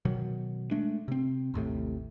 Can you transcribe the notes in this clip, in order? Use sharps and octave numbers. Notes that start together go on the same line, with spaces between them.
B2 D#3 F#3
G#3 A3 D4
C3 C4
A1 D#2 A2 C3